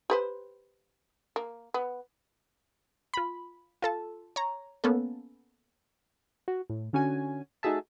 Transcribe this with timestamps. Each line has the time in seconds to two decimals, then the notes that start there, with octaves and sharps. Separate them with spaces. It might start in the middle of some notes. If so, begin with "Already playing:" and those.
0.10 G4 B4 C5
1.36 A#3
1.74 B3
3.14 F4 B5
3.82 F4 A4 A5
4.36 C#5 A#5
4.84 A#3 B3 C#4 A4
6.48 F#4
6.70 A2
6.93 D3 C#4 F#4 G#5
7.63 A3 D#4 F#4 G#4 E5 A5